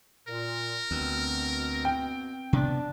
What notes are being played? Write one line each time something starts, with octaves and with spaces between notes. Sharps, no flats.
A#2 A#4
D2 B2 B3 C4
G5
C3 B3 D4